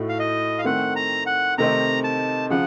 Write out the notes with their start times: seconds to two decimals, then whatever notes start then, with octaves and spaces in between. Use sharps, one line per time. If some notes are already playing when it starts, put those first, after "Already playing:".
Already playing: A2 A3 D#4 F#4
0.09 F5
0.19 D#5
0.59 F5
0.64 D#3 A3 C4 F#5
0.96 A#5
1.26 F#5
1.58 C3 D#3 A3 C4 D#4 A#5
2.04 A5
2.50 C#3 F3 F#5